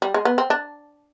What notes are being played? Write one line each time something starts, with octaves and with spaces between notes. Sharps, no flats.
G3
G#3
B3
C4
D4